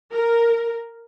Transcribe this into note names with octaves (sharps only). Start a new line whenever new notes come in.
A#4